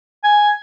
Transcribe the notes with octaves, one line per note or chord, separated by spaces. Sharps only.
G#5